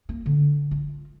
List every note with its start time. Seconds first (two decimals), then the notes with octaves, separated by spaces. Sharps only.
0.09 A#3
0.26 D3
0.71 F4